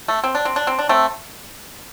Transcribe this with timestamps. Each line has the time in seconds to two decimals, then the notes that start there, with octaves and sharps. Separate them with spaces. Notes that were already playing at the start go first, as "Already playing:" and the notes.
0.08 A3
0.24 C4
0.35 D4
0.45 C4
0.56 D4
0.67 C4
0.79 D4
0.89 A3 C4